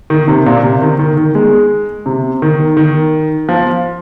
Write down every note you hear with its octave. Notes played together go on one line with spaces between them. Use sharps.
D#3
C3
A#2
C3
D#3
D#3
D#3
G#3
C3
D#3
D#3
F3